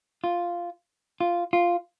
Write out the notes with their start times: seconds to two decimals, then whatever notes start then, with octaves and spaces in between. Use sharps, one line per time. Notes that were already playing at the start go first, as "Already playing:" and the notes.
0.24 F4
1.21 F4
1.53 F4